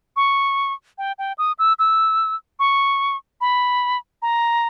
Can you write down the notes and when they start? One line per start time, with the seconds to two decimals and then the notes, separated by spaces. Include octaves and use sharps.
0.16 C#6
0.98 G5
1.19 G5
1.38 D#6
1.59 E6
1.79 E6
2.59 C#6
3.41 B5
4.22 A#5